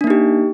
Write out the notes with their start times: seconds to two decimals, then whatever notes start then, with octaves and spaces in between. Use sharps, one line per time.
0.01 D4
0.04 A#3
0.07 D#4
0.10 G4